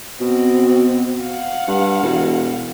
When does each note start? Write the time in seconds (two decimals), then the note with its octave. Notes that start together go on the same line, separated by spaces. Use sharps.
0.21 B2 C4 F#4
1.24 F5 F#5
1.68 G2
2.03 E1